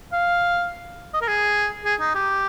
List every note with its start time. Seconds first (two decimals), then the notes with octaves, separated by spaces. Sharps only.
0.13 F5
1.14 D#5
1.21 A#4
1.28 G#4
1.85 G#4
2.00 D#4
2.15 G4